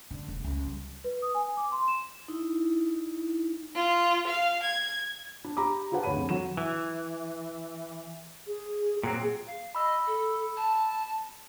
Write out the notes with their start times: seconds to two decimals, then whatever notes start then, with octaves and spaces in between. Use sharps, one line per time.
0.11 D3
0.28 E1
0.44 C#2
0.66 G3
1.04 B4
1.22 D#6
1.35 G#5
1.57 D6
1.72 C6
1.88 E7
2.28 D#4 E4
3.75 F4
4.27 F5
4.63 G#6
5.44 D4
5.57 G4 A#5 B5 D6
5.92 F4 G4 G#4 B4 F#5 A5
6.03 D2 C#5 B5 D#7
6.16 F2
6.29 F#3 E7
6.57 E3
8.47 G#4
9.03 A#2 F#3 C4 G#4
9.47 F5
9.75 D#5 B5 E6
10.07 A4
10.57 A5